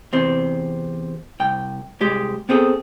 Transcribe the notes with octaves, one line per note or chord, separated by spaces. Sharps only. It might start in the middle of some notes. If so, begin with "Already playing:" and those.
E2 C3 C4
C2 G5
C2 G#3 G4
B3 C4 F4 G#4 A4